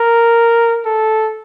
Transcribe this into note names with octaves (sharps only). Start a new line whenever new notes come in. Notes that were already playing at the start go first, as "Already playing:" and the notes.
Already playing: A#4
A4